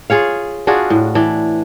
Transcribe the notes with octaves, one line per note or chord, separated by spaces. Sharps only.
F4 G#4 C#5 F5
D4 F4 F#4 G#4
A2
E3 D4